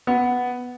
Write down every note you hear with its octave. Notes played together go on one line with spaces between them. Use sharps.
B3